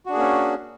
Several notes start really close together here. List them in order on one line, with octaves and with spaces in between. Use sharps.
F#4 D4 G#4 A#3 C#4